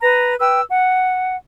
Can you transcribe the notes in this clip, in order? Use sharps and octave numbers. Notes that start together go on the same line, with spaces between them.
B4 A#5
B4 G5 E6
F#5